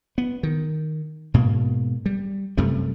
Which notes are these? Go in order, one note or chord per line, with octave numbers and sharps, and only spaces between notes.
B3
D#3
G#2 B2 A#3
G3
F#2 C3 G3 A3